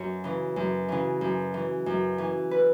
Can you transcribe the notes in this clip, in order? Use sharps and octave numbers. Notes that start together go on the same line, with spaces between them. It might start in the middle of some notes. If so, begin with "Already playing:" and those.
Already playing: F#2 C#5
C#3 E3
F#2
C#3 E3
F#2
E3
F#2
E3
B4